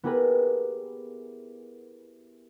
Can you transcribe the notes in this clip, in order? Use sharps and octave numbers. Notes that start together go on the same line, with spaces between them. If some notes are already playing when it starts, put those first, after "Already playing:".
B3 E4 G4 G#4 A#4 B4